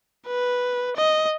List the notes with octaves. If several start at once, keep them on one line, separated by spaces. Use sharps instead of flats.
B4
D#5